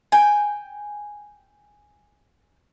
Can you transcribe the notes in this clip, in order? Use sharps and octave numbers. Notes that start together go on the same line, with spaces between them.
G5 G#5